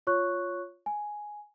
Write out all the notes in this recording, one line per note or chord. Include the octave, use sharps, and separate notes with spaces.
F4 C#5 C#6 F#6
G#5